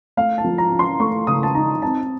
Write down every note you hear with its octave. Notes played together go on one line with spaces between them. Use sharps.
A3 F5
A5
F3
A#5
C#4
C6
A3 C#6
C#3 D#6
A5
D#4 A#5
C4 A5